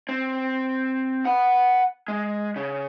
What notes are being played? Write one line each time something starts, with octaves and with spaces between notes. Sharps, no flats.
C4
F#5 B5
G#3
C#3